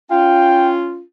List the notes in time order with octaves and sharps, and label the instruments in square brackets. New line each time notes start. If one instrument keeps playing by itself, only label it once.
[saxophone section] C#4 F4 [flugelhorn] G5